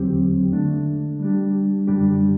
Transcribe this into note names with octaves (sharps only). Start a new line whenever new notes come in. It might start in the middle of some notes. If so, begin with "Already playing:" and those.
Already playing: E2 D3 F#3 C4 G4
D3 A3 D4
G3 D4 G4
F#2 D3 G3 D4 G4